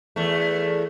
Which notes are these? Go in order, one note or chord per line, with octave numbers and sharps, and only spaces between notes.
E2 A3